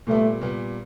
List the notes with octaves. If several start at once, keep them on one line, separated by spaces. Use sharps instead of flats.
A#2 G3 A3 B3
A#2 G3 B3